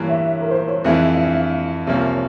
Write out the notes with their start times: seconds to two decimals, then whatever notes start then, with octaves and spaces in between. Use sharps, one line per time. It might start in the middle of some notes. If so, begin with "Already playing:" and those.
Already playing: G2 E3 A#3 C#5
0.09 E5
0.41 A#4
0.51 C5
0.68 C#5
0.84 F2 E3 G#3 E5
1.10 F5
1.18 E5
1.25 F5
1.36 F5
1.86 C2 C3 F3 A#3 C#4 E5
2.12 C#5